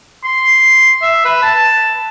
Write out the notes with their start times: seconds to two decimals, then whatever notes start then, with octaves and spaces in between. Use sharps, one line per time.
0.24 C6
1.01 E5
1.25 B4
1.42 A5